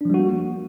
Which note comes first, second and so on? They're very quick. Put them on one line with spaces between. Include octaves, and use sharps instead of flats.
D4 F3 G3 F#4 A#3